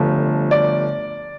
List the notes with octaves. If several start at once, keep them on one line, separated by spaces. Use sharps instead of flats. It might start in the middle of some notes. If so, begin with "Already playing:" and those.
Already playing: G1 G2 F3 A3 D4 A4
D5